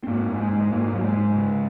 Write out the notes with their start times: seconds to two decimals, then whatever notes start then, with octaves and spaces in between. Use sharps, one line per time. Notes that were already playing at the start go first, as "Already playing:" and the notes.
0.04 C4
0.07 G#2 A#3
0.29 G#2
0.39 G#3
0.49 G#2
0.61 G#3
0.71 G#2 A#3
0.93 G#2 F#3
1.03 G#3
1.14 G#2
1.36 C#3